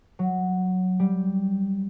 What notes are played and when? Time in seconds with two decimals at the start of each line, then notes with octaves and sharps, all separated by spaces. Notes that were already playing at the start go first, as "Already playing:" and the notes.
0.19 F#3
0.99 G3